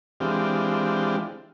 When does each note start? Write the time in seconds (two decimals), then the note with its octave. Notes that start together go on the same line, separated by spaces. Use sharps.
0.20 E3 G#3 C4 D4 F4 G4